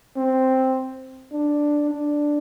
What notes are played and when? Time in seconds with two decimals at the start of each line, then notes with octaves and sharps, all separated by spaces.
0.16 C4
1.32 D4
1.91 D4